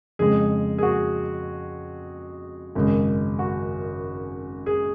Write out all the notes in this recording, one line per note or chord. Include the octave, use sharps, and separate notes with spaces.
F2 C#3 G#3 G#4
G#4
F#4
G#1 F#2 C#3 G#3
F#4
G#4